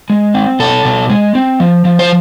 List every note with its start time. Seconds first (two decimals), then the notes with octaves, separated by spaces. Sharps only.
0.10 G#3
0.34 C4
0.60 B2 A4
0.85 B2
1.10 G#3
1.35 C4
1.60 F3
1.85 F3
1.99 C5